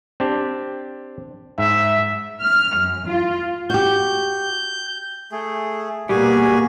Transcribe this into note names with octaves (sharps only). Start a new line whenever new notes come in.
C4 D4 G4
G#2 E5
F6
F#2
F4
F#4 G4 G6
A3 G#4
B2 G3 A#3 F#4 G#4 G#5